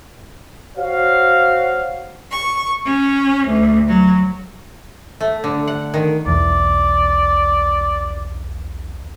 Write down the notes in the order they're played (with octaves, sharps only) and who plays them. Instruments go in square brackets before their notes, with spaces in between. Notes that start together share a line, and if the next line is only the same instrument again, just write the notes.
[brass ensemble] F#4 C5 C#5 F5
[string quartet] C#6
C#4
D2
F#3
[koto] A3
D3
F#5
D#3
[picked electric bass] B1 E2 [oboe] D5